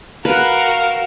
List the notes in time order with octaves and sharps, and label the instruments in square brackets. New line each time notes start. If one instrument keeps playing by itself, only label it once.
[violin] F#4 A#4 [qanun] B4 [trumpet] F5